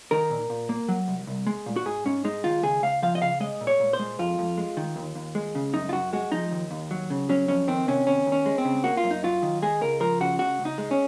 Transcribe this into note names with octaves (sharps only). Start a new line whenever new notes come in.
D#3 A#4
A#2
A#2
A#3
F#3
C2
C2
G#3
A#2
F#4
G#2 G#4
G#2 C#4
G#3 D#4
D#3 F4
C#2 G#4
C#2 F5
F3 F5
D#5
C#3 F5
G#3 D#5
A#2
C#5
A#2
C5
G#3
F2 F4
F2
G#3
D#3
D#2
D#2
G#3
C#3
F#2 D#4
F4
F#2 F#4
G#3 F#4
F3 D#4
D#2
D#2
F#3
C#3
F#3 C#4
F2 C#4
D#3 C4
C3 C#4
D#2 C#4
D#2
C#4
G#3
C4
C#3
A#3 F#4
F4
F#2
D#4
F#3 F4
D#3
G#3 G#4
C#2 A#4
F3 A#4
C#3 F#4
C#2 F#4
C#2
D#4
G#3
C#4